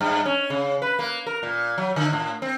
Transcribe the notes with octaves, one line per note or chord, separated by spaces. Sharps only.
G2
C#4
C#3
B4
A#3
A#4
A#2
F#3
D3
A2
C4